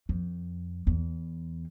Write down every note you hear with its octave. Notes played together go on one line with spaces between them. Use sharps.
F2
E2